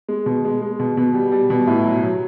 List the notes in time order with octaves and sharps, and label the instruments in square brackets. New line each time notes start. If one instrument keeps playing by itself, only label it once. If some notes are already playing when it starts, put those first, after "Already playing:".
[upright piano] G#3
B2
G#3
G#3
B2
B2
G3
G3
B2
A2
F#3
F#3